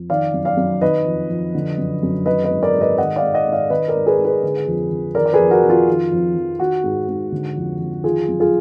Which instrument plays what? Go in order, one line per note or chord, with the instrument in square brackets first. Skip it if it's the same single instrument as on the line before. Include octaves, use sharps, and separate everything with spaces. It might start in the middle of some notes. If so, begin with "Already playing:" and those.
Already playing: [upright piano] F2
D#3 D5 F5
F#2
D5 F5
F#2
D#3 B4 D#5
F2
F2
D3
F#2
F#2
D#3 B4 D#5
B4 D#5
G#2
A#4 D5
G#2
B4 D#5
D#3 D#5 F#5
D5 F5
G#2
D#5 F#5
G#2
D5 F5
D#3 B4 D#5
A#4 D5
G#2
G#4 B4
G#2
G#4 B4
D3
F2
F2
D#3 A#4 D5
D5
G#4 B4
F2
F#4 A#4
F2
F4
D#3
F2
F2
D#3 F#4
G#2
G#2
D3
F2
F2
D#3 F4 G#4
F#2
F4 G#4